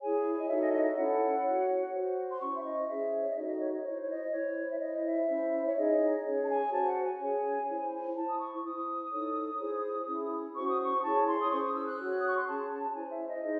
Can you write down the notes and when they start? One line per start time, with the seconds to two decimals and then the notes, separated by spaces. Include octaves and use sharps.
0.01 E4 G#4 C#5 G#5
0.39 D#5
0.48 D#4 F#4 A4 C#5 E5
0.61 D#5
0.73 D#5
0.84 E5
0.96 C#4 E4 A4 C#5 F#5
1.44 F#4 C#5
1.92 F#4 C5
2.30 C6
2.41 C#4 E4 C5 C#6
2.57 E5
2.64 D#5
2.88 C#4 G#4 C5 E5
3.22 C#5
3.30 D#5
3.36 D#4 F#4 A4 E5
3.48 D#5
3.60 C#5
3.73 D#5
3.84 E4 C5 C#5
4.02 C#5
4.09 D#5
4.32 E4 C5 C#5
4.72 E5
4.80 E4 C5 D#5
5.05 E5
5.28 C#4 E4 C5
5.65 C#5
5.76 D#4 G#4 C#5 D#5
6.25 C#4 G#4 C#5
6.44 A5
6.49 G#5
6.72 F#4 C5 A5
6.80 G#5
6.88 F#5
7.04 G#5
7.20 C#4 G#4 C#5
7.68 E4 C5
8.16 E4 C5 A5
8.29 D#6
8.40 C#6
8.63 E4 C5 D#6
9.12 D#4 A4 C#5
9.60 E4 G#4 C5
10.08 C#4 E4 G#4
10.55 C#4 F#4 C5 C#6
10.69 D#6
10.83 C#6
11.04 E4 G#4 C#5 A5
11.27 C6
11.41 D#6
11.51 C#4 G#4 C5 C#6
11.63 D#6
11.75 E6
11.88 F#6
12.00 F#4 C#5
12.19 D#6
12.28 C#6
12.38 C6
12.47 C#4 G#4 C#5 A5
12.72 A5
12.91 A5
12.95 E4 C5 G#5
13.12 E5
13.28 D#5
13.44 D#4 G#4 C5